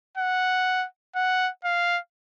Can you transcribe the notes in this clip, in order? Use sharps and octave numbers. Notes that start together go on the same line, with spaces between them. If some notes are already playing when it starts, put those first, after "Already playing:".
F#5
F#5
F5